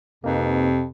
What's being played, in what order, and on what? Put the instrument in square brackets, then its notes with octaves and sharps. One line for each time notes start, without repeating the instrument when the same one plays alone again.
[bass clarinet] F2 [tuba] C3 [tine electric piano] A#3 D#4 B4